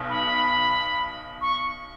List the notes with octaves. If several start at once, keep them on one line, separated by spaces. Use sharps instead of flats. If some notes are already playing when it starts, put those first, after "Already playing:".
Already playing: B1 B2
B5
C#6